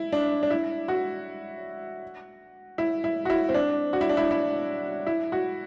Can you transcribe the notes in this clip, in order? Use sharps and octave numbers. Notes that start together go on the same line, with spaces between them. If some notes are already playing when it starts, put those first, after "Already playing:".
Already playing: E4
D4
D4
E4
F#4
E4
E4
F#4
E4
C4
D4
F#4
E4
D4
E4
E4
E4
F#4